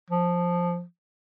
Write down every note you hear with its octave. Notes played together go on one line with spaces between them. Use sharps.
F3